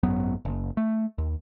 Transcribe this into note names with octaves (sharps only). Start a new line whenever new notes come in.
G#1 F#2 F#3 B3
F#1
A3
D#2